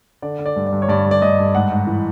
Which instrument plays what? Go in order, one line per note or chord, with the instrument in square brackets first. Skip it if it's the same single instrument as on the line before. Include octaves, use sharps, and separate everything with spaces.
[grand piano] D3 D5
D3
D5
G2
D5
G2
C#5
G2 D5
G2
D5
G2 D#5
G2
G#2 F#5
G#2
E3